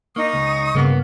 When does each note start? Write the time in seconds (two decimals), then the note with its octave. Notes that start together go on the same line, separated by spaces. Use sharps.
0.16 A#3 D#4 C#6 D#6
0.33 C#2
0.75 G2 C#3 A#3 B3